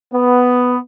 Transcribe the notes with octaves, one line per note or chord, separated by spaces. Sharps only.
B3